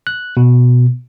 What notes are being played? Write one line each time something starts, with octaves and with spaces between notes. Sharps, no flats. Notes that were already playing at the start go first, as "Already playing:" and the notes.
F#6
B2